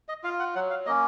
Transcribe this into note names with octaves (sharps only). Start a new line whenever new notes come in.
D#5
F4 F5
F#5
F#3 F#5
F5
A#3 C#4 D#5